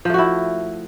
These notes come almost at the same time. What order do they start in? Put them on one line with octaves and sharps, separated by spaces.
F3 A3 F#4 E4